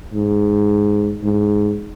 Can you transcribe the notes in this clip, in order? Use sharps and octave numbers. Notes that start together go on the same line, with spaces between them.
G#2
G#2